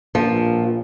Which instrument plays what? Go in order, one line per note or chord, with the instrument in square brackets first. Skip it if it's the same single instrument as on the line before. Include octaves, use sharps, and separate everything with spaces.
[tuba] A#1 [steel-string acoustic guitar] F3